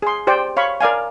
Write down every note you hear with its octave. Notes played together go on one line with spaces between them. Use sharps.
G#4 C6
G4 C5 D5 G5
C#5 F5 B5 C#6
A#4 D5 F5 G#5